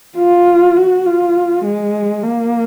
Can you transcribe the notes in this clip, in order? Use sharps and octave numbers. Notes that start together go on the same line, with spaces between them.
F4
F#4
F4
G#3
A#3